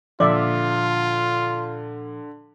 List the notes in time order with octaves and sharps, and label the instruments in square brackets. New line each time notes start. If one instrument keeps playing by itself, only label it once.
[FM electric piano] A#2 F3 [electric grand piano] D3 [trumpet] F4 [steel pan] D5 E5